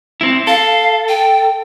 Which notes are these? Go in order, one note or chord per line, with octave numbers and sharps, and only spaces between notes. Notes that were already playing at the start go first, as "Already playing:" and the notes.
C4 E4
A4 F5
G5